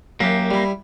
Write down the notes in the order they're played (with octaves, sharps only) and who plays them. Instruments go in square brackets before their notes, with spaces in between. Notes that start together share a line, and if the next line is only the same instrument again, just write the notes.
[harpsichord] F#2 E5 [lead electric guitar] A#3 G4
[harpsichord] G3 E4